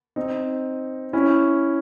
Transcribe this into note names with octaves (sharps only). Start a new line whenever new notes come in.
C4 D#4
C#4 E4